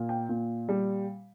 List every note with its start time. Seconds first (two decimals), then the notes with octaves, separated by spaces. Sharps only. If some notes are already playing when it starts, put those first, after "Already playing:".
Already playing: A#2 A#3
0.09 G5
0.29 A#2
0.69 G3